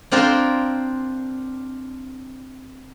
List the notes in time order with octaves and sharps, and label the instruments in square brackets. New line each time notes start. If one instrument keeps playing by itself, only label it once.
[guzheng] C4 D4 F4 A#4 C5